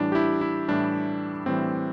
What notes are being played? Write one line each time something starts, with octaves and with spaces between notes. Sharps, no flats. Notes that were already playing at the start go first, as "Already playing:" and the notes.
Already playing: A2 E3 G3 D4
G4
E4
E4
A2 E3 G3 D4
A2 E3 G3 C4